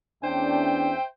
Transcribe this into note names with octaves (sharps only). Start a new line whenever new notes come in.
E2 C#4 D4 C5 E5 G5